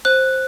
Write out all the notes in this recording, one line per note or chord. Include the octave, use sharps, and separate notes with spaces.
C5 F#6